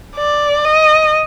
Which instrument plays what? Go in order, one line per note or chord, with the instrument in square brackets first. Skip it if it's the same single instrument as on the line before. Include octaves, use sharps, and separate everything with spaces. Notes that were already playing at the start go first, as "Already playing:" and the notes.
[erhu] D5
D#5